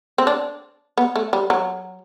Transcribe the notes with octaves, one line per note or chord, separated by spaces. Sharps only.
C4
D4
B3
A3
G3
F#3